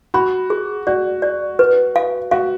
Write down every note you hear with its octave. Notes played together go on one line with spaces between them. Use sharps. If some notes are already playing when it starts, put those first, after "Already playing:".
F#4 B5
G#4
F#4 D5
D5
B4
F5
F#4 F5